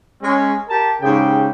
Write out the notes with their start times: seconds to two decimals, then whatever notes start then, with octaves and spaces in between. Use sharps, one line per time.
0.22 G#3 C#4
0.69 G4 A#4 A5
1.02 G#2 C#3 G4 G5